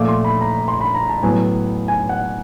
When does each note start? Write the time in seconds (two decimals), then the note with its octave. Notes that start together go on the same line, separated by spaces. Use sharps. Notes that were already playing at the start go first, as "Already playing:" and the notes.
Already playing: A#2 F3 A3 D6
0.08 C6
0.25 B5
0.41 A#5
0.68 C6
0.81 B5
0.95 A#5
1.09 A5
1.23 A2 F#3 B3 G#5
1.88 G#5
2.09 F#5